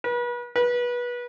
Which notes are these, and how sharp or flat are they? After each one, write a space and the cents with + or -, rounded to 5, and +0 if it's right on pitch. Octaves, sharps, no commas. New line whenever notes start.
B4 -35
B4 -25